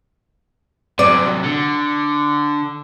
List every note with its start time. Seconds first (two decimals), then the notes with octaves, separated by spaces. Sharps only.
0.99 C3 F#3 D5
1.44 D3